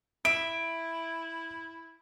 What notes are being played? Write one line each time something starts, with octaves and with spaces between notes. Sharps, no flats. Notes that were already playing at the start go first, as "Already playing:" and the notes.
E4 E5 D7